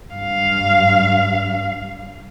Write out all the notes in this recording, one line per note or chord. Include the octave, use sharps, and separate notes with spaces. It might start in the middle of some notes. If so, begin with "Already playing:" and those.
G2 F5